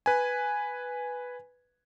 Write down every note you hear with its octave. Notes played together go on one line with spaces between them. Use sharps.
B4 G#5